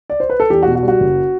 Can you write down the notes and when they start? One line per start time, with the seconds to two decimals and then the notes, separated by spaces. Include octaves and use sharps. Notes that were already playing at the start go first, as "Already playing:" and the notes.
0.10 D5
0.20 C5
0.30 B4
0.40 A4
0.50 E2 G4
0.63 F#4
0.67 B2
0.75 F#4
0.83 G3
0.88 F#4
1.00 F#1